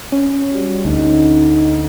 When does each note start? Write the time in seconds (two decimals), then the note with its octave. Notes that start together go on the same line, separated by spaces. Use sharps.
0.12 C#4
0.53 F#3 G3
0.85 D2 D#4